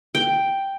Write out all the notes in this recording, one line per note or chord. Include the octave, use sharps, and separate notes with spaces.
G5